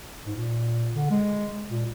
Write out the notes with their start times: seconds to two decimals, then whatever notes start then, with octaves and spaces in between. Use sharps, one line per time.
0.26 G#2
0.35 A#2
0.95 D3
1.10 G#3
1.70 A#2